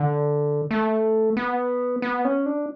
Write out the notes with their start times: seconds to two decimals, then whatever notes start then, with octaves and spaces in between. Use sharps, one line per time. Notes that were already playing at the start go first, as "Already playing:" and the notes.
Already playing: D3
0.71 A3
1.37 B3
2.02 B3
2.25 C#4
2.46 D4